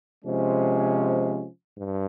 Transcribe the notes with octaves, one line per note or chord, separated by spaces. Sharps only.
C3 F3 G#3 C#4
G2